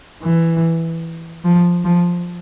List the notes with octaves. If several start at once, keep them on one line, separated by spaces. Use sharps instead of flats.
E3
F3
F3